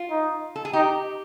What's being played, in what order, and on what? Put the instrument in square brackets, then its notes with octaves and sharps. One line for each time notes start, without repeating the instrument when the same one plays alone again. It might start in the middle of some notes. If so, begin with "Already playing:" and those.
Already playing: [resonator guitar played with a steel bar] F4
[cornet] D#4
[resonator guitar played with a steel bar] A4
G#4
[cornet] D#4 [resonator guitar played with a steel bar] G4